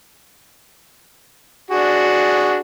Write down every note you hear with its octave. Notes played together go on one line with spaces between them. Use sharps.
D4 F#4 G#4